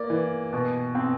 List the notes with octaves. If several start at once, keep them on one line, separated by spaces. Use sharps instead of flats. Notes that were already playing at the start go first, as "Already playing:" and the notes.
Already playing: A#3 D5
E3
B2
C4